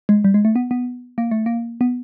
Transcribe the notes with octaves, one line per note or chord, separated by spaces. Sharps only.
G#3
G3
G#3
A3
B3
B3
A#3
A3
A#3
B3